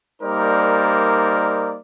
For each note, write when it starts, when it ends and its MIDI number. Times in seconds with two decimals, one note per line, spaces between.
0.22 1.78 55
0.22 1.78 58
0.22 1.78 63
0.22 1.78 70
0.22 1.78 72
0.22 1.78 74